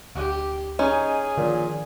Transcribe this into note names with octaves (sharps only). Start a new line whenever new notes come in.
D2 G4
C#4 D#4 G#4
A#2 D3 D#3 F3